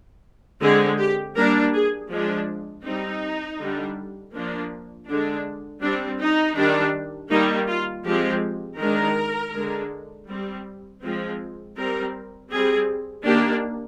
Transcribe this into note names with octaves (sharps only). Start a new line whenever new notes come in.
D3 G#3 C4 G#4
G4
G3 A#3 D4 A#4
G#4
F3 G#3 D4
G3 C4 D#4
D3 G3 D4
F3 A#3 D4
D3 G#3 D4
G3 C4 D4
D#4
D#3 G3 D4
D#3 G3 A#3 D#4
F4
F3 G#3 C4 G4
D#3 G#3 D4 A#4
D3 G#3 D4
G3 C4
F3 G#3 C4
G3 C4 A#4
G3 C4 G#4
D#3 A#3 D4 G4